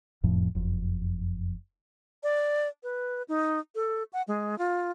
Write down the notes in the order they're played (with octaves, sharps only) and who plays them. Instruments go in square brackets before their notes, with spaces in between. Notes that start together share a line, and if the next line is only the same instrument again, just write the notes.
[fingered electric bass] F#1 F2 A2 F3
F#1 F2
[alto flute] D5
B4
D#4
A4
F#5
G#3
F4